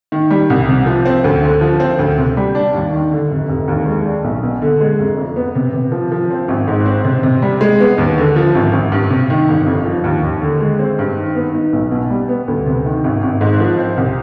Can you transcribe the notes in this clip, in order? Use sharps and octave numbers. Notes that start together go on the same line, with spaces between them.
D#3
G3
C2
C3
F3
C4
D2
D3
F3
C4
D2
C3
G3
D4
D#2
D#3
D3
F1
F1
D#2
G#3
D4
B1
B2
D3
G#3
F1
F2
B3
C3
C3
F3
F3
C4
G#1
G#2
C4
C3
C3
G3
G#3
B3
D#2
D3
F3
G#1
G#1
G2
C3
D#3
G1
F2
F3
D#2
D#2
D3
G#3
C4
G2
D#3
B3
D#4
B1
B2
G3
B3
D2
C3
D#3
G#1
G#1
G#2
F3
C4
C2